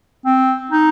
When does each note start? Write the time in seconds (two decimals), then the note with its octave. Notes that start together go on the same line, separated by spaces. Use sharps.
0.26 C4
0.71 D#4